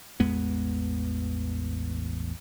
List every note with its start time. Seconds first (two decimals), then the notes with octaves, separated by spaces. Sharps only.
0.20 A1 E2 G#3 B3